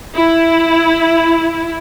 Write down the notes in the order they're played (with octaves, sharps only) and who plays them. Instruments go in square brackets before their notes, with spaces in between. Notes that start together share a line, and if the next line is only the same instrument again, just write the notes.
[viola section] E4